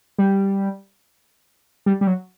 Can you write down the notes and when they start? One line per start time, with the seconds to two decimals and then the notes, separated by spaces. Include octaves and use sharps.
0.18 G3
1.86 G3
2.01 G3
2.07 F#3